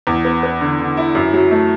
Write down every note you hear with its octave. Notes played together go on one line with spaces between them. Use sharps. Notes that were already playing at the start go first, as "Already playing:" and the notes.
E2
B3
B3
D3
D3
E4
F#2
F#3
A3